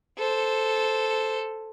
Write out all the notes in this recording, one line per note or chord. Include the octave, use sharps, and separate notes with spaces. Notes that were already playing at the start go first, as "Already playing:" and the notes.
A4 C5